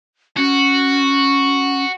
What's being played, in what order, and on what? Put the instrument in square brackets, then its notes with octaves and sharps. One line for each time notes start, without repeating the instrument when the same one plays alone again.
[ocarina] C#4 [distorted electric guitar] F#4